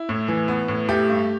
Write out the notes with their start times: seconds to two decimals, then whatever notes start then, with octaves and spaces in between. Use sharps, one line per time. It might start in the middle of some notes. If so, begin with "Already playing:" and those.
Already playing: E4
0.09 A2
0.28 E3
0.48 B3
0.68 A2
0.89 A3 G4
1.09 G2